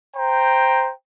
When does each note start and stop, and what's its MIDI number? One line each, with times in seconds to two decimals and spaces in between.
0.15 0.90 72
0.15 0.90 79
0.15 0.90 82